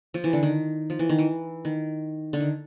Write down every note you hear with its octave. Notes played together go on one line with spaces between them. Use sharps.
F3
E3
D3
D#3
F3
E3
D#3
E3
D#3
D3
D#3